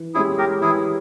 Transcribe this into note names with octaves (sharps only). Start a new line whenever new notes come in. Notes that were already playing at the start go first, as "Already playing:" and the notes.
Already playing: E3
G#3 C#4 E4 G4 G#4
G4 A#4
E3 E4 G#4